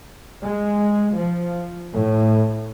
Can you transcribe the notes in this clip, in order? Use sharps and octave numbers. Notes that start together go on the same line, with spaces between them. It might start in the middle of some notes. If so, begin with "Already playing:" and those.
G#3
F3
A2